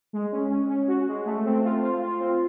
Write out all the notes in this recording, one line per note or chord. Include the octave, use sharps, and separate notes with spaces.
G#3
C#4
C#4
C#4
F#4
G#3
A3
C4
F4
F4
F4
C4